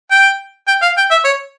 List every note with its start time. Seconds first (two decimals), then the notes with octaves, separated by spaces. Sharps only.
0.11 G5
0.68 G5
0.82 F5
0.97 G5
1.11 E5
1.25 C#5